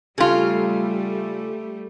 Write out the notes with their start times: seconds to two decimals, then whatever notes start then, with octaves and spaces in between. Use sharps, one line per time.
0.18 C#3 G3 A3 F4 G4 A4